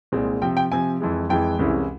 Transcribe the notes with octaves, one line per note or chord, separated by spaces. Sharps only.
C2 A#2 G#3 C4
C3 F3 C4 G5
G5
C3 F3 C4 G#5
F2 E3 G#3
F2 E3 G#3 G5
C2 C3 E3 G#3 C#4